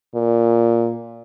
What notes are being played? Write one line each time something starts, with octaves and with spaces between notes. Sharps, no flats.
A#2